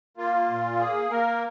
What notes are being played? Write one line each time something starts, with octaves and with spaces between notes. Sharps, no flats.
A#3 F4
A#2
A#3 G#4
A#3 A#4